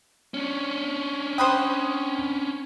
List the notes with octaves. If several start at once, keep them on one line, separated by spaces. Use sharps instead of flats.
C#4 D4
C5 F#5 G5 B5 D#6